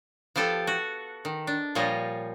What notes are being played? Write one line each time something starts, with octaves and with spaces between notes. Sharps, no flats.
F3 B3 G4 A4
F#4
D#3
D4
A#2 F3 G3 C#5 D#5